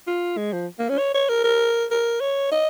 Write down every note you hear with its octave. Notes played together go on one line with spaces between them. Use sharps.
F4
G#3
F3
A#3
C#4
C#5
C#5
A#4
A#4
A#4
C#5
D#5